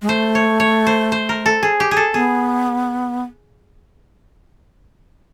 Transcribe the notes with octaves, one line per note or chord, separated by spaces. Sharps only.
G#3
A3 C5
C#5
C#5
C5
C5
A#4
A4
G#4
G4
G#4
A4
B3 G#4